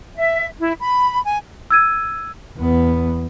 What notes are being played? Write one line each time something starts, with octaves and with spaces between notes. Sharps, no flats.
E5
E4
B5
G#5
E6 G#6 D#7
E2 B3